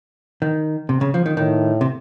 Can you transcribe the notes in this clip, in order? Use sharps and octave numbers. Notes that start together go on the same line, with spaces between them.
D#3
C3
C#3
F3
D#3
A2 D#3
C3